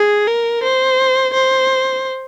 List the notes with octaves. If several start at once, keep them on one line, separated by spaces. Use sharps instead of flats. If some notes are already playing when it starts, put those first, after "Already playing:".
Already playing: G#4
A#4
C5
C5